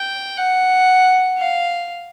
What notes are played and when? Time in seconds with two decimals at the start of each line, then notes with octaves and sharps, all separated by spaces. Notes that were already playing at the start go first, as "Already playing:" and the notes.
Already playing: G5
0.37 F#5
1.38 F5